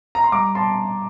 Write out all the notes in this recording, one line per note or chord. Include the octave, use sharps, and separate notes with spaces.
A#5
C6
G3 A#5 D6
A5 C6